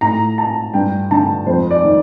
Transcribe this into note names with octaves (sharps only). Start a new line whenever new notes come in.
A2 A#5
A5
G2 G5
D3 A5
F2 C5
D5
D#3